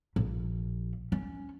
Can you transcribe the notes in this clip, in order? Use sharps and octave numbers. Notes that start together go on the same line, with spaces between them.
A#1
C#4